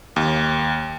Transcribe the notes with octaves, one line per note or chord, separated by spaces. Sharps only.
D#2